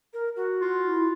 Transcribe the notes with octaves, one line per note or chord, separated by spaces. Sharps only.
A#4
F#4
F4
E4